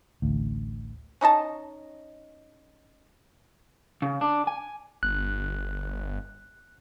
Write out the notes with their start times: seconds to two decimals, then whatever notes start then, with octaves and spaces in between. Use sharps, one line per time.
0.22 A1 D2
1.21 C#4 D#4 D#5 A5
4.02 C#3
4.21 D4
4.47 G#5
5.03 G1 F#6